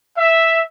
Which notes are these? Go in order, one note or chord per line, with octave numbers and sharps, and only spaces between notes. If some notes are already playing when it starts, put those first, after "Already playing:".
E5